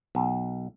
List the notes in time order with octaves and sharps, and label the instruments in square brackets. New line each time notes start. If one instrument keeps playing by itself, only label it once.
[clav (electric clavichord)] B1